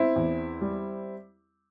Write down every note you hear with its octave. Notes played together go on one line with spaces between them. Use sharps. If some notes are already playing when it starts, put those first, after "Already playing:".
Already playing: C4 E4
E2
G3